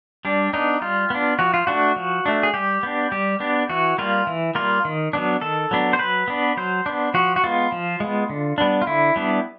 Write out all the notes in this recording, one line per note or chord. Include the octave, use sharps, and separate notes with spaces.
G3 D4
B3 D4 D#4
G3 F4
B3 D4
F3 F#4
F4
A3 D4 F#4
F3
A3 D4
G#4
G3 G4
B3 D4
G3 G4
B3 D4
E3 F#4
G3 A#3 F4
E3
G3 A#3 F4
D#3
F#3 B3 D4
D#3 A4
F#3 B3 D4
C5
F#3 B4
B3 D4
F#3 C5
B3 D4
F3 F#4
F#4
G#3 B3 F4
F3
G#3 B3
D3
G3 B3 D4
F4
D3 E4
G3 B3 D4